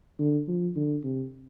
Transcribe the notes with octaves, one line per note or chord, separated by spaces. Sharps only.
D3
F3
D3
C3